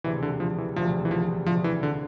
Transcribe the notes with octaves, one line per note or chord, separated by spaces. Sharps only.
E1 D2 C3 E3
D3
F3
E3
E1 D2 C3 F3
E3
F3
E1 D2 C3 F3
E3
D3